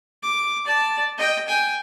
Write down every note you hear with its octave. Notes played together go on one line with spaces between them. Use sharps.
D6
D5 A5
D#5 G5
G5 G#5